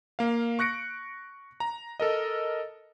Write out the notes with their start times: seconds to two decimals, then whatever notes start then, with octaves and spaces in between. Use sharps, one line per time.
0.19 A#3 F5
0.59 C#6 F#6 A#6 C#7 D7
1.60 A#5
2.00 A4 A#4 D#5